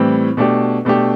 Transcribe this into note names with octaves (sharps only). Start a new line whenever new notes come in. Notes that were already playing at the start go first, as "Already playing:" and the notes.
Already playing: A2 E3 G3 C4
B2 A3 D4 G4
B2 A3 D4 G4